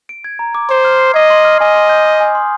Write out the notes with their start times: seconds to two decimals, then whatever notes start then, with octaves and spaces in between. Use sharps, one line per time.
0.09 D7
0.24 G#6
0.39 A#5
0.55 D6
0.69 C5 C6
0.85 F6
0.99 C7
1.14 D#5 G#6
1.30 C6
1.45 F6
1.60 D#5 G#5
1.76 C6
1.89 G6
2.05 D#6
2.20 G#5
2.35 C6